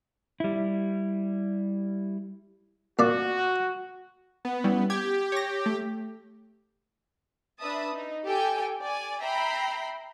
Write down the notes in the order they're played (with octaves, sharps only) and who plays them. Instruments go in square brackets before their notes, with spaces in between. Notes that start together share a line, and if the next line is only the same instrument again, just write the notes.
[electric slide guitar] G3 E4
[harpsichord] A#2 D5 [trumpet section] F#4
[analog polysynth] B3
[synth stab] G3 C#4 E4
[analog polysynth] G4 [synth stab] G#6
[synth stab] C#5 A#6
A3
[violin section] D4 B4 E5 A5 D#6
D#4
G4 A4 G5 G#5
D5 G#5
E5 G5 A#5 B5 C7